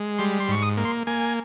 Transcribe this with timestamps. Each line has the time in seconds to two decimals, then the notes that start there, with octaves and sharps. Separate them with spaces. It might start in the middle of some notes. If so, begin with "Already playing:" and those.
Already playing: G#3
0.18 G3 C6
0.40 C6
0.48 G#2 C#6
0.62 D#6
0.77 A#3
0.85 C6
1.07 A#3 G#5